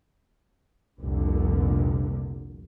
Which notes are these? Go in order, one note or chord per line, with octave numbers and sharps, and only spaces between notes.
F1 C2 A#2 D3